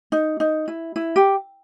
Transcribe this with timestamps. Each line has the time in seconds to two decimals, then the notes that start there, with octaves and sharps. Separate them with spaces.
0.12 D#4
0.40 D#4
0.68 E4
0.96 E4
1.16 G4